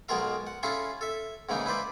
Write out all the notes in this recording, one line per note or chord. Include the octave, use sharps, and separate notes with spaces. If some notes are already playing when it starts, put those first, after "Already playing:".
B1 B2 G#3 F4 A#4 F5
F#5
C#4 E4 F4 G#4 A4 F5
A4 E5
G#2 C#3 E3 A#3 D#4
E4 B4 C5 D5